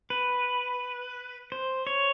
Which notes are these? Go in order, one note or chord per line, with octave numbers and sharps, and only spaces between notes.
B4
C5
C#5